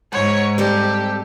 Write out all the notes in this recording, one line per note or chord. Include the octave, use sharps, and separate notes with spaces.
G#2 C#5 F#5
G3 C4 G4 A4